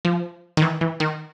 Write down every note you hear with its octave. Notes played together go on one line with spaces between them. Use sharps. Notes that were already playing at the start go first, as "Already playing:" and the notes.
F3
D#3
E3
E3
D#3